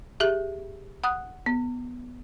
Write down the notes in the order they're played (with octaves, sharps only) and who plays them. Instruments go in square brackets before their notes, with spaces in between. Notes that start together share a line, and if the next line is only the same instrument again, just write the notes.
[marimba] G4 G#4 E5
F#5 D#6 F#6
B3